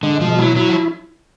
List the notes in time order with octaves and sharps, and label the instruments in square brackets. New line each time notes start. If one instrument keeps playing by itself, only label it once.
[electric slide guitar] D3 [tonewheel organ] G#3
[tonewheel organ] B2 [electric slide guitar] F3
[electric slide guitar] F#3 [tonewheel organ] E4
[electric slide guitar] F#3 [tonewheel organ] E4
[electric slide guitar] F3